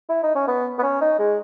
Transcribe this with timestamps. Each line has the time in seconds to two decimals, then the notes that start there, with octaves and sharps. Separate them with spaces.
0.09 E4
0.23 D#4
0.35 C#4
0.48 B3
0.78 B3
0.83 C#4
1.01 D#4
1.19 G#3